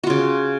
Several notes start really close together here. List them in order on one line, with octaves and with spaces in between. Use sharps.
F#4 F4 C#3